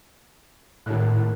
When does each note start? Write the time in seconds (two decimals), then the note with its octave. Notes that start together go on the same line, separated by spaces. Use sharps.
0.86 G#1 A2 F#6